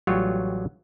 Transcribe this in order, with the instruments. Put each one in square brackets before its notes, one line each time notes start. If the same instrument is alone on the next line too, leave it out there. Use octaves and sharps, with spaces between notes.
[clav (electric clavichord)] A1 F#3 G3 F4 C#5